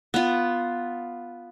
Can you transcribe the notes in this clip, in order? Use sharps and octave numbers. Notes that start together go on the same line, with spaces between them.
B3 F4